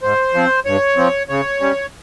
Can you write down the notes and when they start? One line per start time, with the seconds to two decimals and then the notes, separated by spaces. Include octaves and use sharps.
0.02 G#2 C5
0.34 F3 C4
0.66 G2 C#5
0.97 F3 C4
1.29 C#3 C#5
1.61 G3 C#4